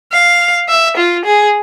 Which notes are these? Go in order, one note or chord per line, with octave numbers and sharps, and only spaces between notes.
F5
E5
F4
G#4